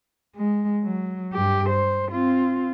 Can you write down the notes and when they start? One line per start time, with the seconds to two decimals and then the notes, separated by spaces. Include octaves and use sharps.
0.36 G#3
0.83 F#3
1.34 G2 G4
1.69 C5
2.11 C4 F4